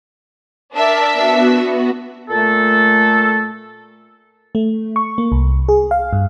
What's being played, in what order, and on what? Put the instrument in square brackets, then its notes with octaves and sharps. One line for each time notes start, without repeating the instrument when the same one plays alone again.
[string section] D4 E5 [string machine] A#4 D5 A5
[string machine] B3 F#4
[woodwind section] A#2 A3 A4
[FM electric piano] A3
C#6
A#3
C2
G#4
F5
G2